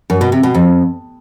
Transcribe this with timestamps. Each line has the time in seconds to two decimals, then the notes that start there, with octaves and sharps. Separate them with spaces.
0.10 F#2
0.21 B2
0.32 C3
0.43 B2
0.54 F2